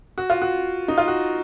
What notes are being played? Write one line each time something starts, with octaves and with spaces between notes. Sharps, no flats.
F#4
F4
F#4
D#4
F4
F#4